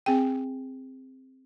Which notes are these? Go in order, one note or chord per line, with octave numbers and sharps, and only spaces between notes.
C4 G#4 G5